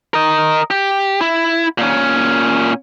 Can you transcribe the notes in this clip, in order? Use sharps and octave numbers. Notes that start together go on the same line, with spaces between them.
A#4 D#5
G4
E4
A#2 C#4